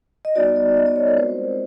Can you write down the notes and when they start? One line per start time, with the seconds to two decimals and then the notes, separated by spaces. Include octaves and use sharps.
0.25 D#5
0.36 G3 B3 D#4 F#4 D5
0.56 D5
0.77 D#5
0.86 D5
0.96 C#5
1.07 A#4
1.17 G#3 C4 F4 C5